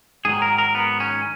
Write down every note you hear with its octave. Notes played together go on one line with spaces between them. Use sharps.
G#2 D#3 F#3 G#4
A#4
A#4
B3
C#4